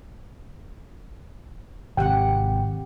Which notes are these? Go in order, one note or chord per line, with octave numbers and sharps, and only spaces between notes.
G#1 C3 G4 F#5 G5